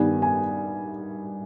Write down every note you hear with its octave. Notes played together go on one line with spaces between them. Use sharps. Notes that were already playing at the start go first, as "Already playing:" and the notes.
Already playing: G2 D#3 G3 B3 G#5
G#5